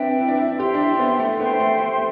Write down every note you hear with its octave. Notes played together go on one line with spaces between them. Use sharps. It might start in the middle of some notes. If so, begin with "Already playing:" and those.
Already playing: C4 D4 B4 E5 G5
E4
D4
E4
G4 C5 E5 G5 C6
D4
E4
B3
A3
B3 C5 E5 G5 C6
A3
A3